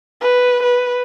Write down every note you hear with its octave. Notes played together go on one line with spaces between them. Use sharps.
B4
B4